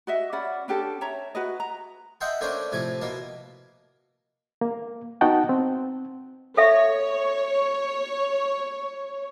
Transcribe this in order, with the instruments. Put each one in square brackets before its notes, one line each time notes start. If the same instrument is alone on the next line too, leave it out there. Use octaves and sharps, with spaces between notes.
[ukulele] F#4 D#5 E5
C#4 D5 F#5 B5
C#4 D4 G4 A4
C#5 E5 A#5
F#4 B4 D#5
A#5
[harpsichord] D#5 E5 F#5 G5 A5 C6
A3 A#3 C#4 D4 C5 D5
A2 C3 F3 G#5 D6
B2 A#3 A5
[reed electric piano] A#3
B3 D#4 F#4 F#5 G5 A5
C4
[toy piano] A4 E5 [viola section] C#5